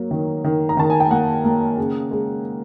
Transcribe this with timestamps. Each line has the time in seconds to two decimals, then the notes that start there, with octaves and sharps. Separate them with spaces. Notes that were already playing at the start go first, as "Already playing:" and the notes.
Already playing: F#3 A#3
0.11 D#3
0.44 D#3
0.69 A#5
0.77 D#3 A5
0.90 G#5
1.00 G5
1.11 A#3 F#5
1.44 A#3
1.78 C#3
2.11 G#3